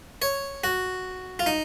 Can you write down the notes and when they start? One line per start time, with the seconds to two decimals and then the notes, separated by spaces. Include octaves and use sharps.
0.22 C#5
0.64 F#4
1.39 F4
1.46 D#4